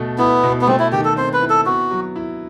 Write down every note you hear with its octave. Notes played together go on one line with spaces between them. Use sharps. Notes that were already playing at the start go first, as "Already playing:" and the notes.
Already playing: B2 A3
B3 E4
B2
B3
A3 C4
E4
D#3 G4
A4
C4 C5
B4
E4
A4
B3 F#4
F#3
E4